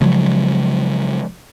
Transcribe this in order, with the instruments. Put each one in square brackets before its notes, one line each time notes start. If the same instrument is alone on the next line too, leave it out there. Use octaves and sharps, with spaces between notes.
[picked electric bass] C#3 F3 F#3 G#3